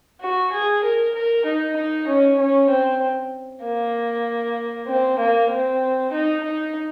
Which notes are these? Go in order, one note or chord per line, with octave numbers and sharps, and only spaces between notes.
F#4
G#4
A#4
A#4
D#4
D#4
C#4
C#4
C4
A#3
C4
A#3
C4
D#4
D#4